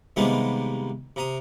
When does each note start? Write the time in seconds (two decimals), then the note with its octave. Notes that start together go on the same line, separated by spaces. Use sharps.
0.16 C3 D#3 G3 G#3 A#3 B3
1.16 C3 A#5 D#6